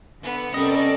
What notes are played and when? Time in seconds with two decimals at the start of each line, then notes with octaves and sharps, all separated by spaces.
0.21 D3 B3
0.54 C3 G3 C#4 A4 A#4 D5 D#5